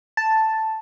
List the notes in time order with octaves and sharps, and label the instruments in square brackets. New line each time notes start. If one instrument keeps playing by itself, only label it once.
[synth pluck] A5